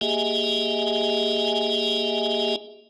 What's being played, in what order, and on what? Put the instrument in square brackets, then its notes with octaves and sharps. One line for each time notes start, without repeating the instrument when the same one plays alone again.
[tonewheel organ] A#3 G4 G#4 D#5 E5 G#5